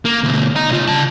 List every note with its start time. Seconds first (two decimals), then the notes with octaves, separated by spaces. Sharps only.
0.05 A#3
0.24 D2 B2
0.56 D#5 A#5
0.70 C2 F4
0.88 C#3 A5